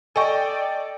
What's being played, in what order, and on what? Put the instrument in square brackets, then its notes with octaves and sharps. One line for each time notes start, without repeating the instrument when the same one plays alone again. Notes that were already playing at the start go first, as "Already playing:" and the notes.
[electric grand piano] A4 D#5 G5 [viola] D5 [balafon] G#5 C#6